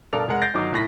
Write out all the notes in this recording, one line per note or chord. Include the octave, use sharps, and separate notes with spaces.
G2 B2 A4 A#4 D5 F7
F1 G#3 A#4 F#5
G6 A6 A#6 C7 D7
G1 D#3 F#3 D#4 D6
C2 A2 A#6 B6